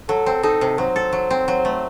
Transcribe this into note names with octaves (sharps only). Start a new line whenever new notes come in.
F#3 A4
C4
D#4 A4
C3
F#3 C5
A4
F#3
C4
F#3
A3